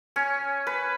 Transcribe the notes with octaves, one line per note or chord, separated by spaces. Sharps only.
C#4
B4